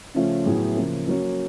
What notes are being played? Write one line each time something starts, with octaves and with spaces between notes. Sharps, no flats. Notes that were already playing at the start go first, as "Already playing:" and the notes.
C#3 F3 A3 C#4 F4
A2 F#3 B3 E4 G#4
C#3 F3 A#3
F#3 A#3 C#4 F#4